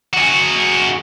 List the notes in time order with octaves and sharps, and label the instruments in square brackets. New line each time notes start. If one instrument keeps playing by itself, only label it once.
[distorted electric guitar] F#4 G#4